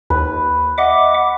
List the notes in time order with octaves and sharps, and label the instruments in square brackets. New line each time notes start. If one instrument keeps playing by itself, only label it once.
[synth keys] D#2 [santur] B4
[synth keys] D#5 [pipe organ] E5 F#5 D6